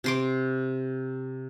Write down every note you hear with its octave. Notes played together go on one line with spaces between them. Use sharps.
C3 C6 D6